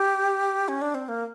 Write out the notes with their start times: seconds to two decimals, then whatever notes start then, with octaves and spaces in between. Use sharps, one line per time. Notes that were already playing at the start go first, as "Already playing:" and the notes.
Already playing: G4
0.68 C#4
0.82 D4
0.94 C4
1.08 A#3